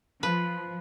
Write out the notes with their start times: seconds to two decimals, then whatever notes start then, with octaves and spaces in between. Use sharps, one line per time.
0.23 F3 B4